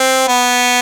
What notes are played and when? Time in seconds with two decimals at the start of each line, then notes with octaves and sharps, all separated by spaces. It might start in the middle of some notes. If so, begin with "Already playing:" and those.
Already playing: C4
0.28 B3